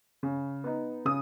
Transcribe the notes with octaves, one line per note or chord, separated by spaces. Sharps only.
C#3
B3 D#4
C#3 D#6